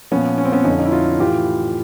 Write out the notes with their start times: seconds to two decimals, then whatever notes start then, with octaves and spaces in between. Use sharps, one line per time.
0.11 F3 B3 C#4
0.15 A#2
0.38 C#4
0.45 C4
0.52 B3 C#4
0.65 F2 D3 F3 C#4 D#4
0.79 D#4
0.85 E4
0.92 D#4 F4
1.19 A2 E3 F4 G4